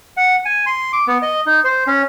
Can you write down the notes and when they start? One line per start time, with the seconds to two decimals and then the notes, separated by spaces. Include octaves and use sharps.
0.17 F#5
0.45 G#5
0.66 C6
0.93 D6
1.07 B3
1.22 D#5
1.46 D#4
1.64 C5
1.87 C#4